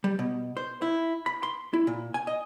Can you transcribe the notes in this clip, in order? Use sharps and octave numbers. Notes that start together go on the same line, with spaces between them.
G3
B2
C5
E4
B5
C6
E4
A#2
G#5
D#5